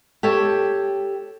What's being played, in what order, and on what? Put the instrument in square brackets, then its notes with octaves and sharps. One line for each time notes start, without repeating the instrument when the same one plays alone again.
[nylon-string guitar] G4 A4 C#5